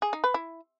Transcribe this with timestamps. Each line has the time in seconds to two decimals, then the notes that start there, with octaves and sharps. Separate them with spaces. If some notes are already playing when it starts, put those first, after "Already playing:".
0.02 G#4
0.13 D#4
0.24 B4
0.34 E4